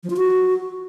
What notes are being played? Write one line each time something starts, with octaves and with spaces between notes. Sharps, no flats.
F3
F4
F#4